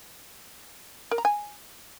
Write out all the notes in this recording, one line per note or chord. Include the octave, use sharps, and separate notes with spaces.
A#4
A#5
G#5